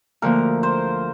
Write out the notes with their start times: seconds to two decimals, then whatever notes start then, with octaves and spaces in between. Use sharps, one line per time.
0.22 D2 D3 F3 A#3 A#4
0.63 C5